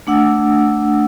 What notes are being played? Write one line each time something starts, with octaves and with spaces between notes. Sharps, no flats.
A3 D4 F#5 E6